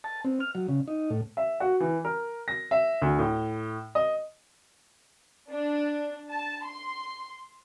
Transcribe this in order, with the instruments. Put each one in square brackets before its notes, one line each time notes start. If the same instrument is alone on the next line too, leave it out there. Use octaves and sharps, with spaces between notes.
[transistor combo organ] A5
C4
F6
F#3
C#3
D#4
A2
[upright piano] E5
F#4
E3
A#4
A#6
E5
D2
A2
D#5
[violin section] D4
A5
C6